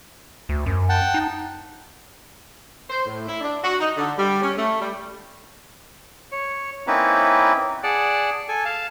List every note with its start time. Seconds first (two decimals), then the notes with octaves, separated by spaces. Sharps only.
0.49 D2
0.66 F#2
0.89 F#5 G5 A5
1.14 D#4
2.90 C5
3.06 A2
3.28 E4
3.41 D4
3.64 F#4
3.81 D#4
3.97 D3
4.19 G3
4.42 C#4
4.57 A3
4.80 G3
6.32 C#5
6.87 A#3 C4 C#4 D#4 E4 B4
7.83 G#4 D5 F#5 A5
8.48 A4 G#5
8.65 F5 A5